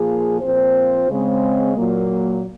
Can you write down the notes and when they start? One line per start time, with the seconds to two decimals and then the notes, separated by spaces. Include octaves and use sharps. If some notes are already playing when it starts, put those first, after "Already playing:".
Already playing: A#2 F3 A#3 F4 G#4
0.41 A#2 F3 C4 F4 C5
1.09 C#3 G#3 C4
1.77 A#2 F#3 A#3